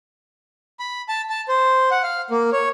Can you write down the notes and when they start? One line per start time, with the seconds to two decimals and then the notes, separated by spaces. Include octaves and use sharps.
0.80 B5
1.09 A5
1.30 A5
1.49 C5
1.91 F#5
2.03 F5
2.31 A#3
2.53 C#5